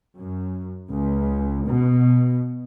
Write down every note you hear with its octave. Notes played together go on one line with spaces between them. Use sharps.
F#2
C#2
B2